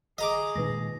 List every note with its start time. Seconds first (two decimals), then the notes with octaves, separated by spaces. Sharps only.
0.18 G#4 D#5 A#5 D6
0.56 A#2 D#3 G#3 D#4 B4 A#6